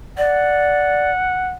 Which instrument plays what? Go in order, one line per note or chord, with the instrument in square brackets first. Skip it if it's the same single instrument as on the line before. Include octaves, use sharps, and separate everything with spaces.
[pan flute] D5 [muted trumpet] F#5